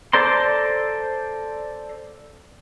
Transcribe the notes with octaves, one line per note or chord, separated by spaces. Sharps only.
A4 C5 D5 A#5 C6